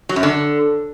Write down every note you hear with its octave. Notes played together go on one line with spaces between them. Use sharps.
F#3
F#2
D3